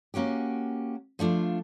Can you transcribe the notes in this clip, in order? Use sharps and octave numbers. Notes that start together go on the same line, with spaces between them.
A#3 C#4 F#4 G4
F3 A3 D4 F4